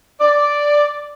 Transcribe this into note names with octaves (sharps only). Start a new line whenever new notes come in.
D5